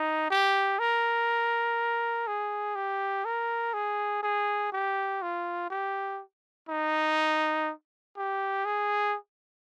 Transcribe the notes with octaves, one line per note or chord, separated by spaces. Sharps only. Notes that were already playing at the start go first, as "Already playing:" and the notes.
Already playing: D#4
G4
A#4
G#4
G4
A#4
G#4
G#4
G4
F4
G4
D#4
G4
G#4